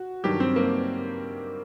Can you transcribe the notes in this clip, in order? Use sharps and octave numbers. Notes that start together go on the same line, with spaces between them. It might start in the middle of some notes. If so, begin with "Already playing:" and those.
Already playing: F#4
G2 D#3 F#3 G4
C4
A#3